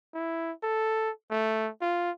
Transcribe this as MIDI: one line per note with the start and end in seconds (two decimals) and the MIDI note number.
0.14 0.52 64
0.63 1.11 69
1.31 1.70 57
1.81 2.11 65